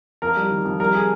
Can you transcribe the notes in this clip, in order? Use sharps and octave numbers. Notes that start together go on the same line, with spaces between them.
F2 A#4
G3
D#3
F2
G3 A#4
G#4